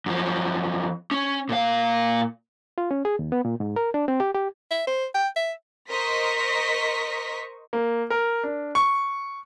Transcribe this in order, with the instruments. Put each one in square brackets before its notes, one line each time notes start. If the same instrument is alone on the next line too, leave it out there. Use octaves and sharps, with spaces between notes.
[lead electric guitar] F#2 F3
C#4
A#2 F5
[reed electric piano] F4
C#4
G#4
D#2
B3
A#2
G#2
A#4
D4
C4
G4
G4
[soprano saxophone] E5
C5
G5
E5
[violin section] A#4 C5 D#5 C#6 B6
[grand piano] A#3
A#4
D4
C#6